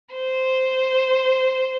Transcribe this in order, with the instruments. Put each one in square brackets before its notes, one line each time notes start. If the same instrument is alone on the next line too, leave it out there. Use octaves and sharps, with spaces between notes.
[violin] C5